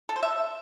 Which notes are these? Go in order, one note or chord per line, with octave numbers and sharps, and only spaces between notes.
A4
C5
E5